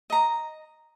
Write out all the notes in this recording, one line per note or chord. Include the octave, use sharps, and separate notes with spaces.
D#5 A#5